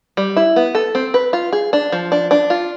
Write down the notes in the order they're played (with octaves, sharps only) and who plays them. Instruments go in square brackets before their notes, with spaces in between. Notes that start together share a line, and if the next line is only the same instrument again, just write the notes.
[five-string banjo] G3
E4
B3
A4
C4
B4
F4
G#4
D4
F3
D4
D4
F4